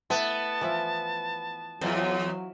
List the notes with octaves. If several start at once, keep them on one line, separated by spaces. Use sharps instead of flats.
A3 B3 E4 A5
E3 F3 E4
E2 E3 F#3 F4 C5